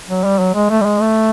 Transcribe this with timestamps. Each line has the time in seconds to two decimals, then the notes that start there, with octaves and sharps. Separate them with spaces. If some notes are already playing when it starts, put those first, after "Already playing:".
0.08 F#3
0.24 G3
0.39 F#3
0.54 G#3
0.70 A3
0.81 G3
0.85 G#3
1.01 A3